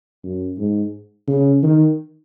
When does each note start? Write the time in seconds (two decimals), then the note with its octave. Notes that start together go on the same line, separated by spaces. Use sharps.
0.24 F#2
0.58 G#2
1.27 C#3
1.63 D#3